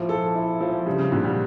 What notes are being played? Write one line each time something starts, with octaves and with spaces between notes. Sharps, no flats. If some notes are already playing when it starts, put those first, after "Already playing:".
Already playing: A#2 F3 A#3 E4
A4
E4
F3
C#3 G3
C#3
A#2 D3
G3